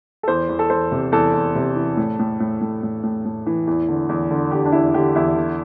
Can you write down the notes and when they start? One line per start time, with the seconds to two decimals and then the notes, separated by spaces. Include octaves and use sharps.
0.23 A4
0.27 E2 C5
0.49 E2
0.59 A4
0.70 E2 C5
0.92 C3
1.12 E2 A4
1.33 E2
1.55 C3
1.76 E3
1.97 A2
2.19 A2
2.40 A2
2.61 A2
2.83 A2
3.03 A2
3.25 A2
3.47 E3
3.67 E2
3.88 D3
4.09 E2
4.31 D3
4.52 D3 G4
4.66 D4
4.72 E2 E4
4.94 D3 G4
5.15 E2 E4
5.36 D3